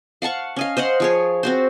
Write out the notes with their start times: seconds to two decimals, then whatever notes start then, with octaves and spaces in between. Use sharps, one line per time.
0.22 F5 F#5 A5 C#6
0.56 C#4 D#5 F5
0.77 C5 D#5 F5 F#5
1.00 F3 G#4 C#5
1.43 C4 F#4 C5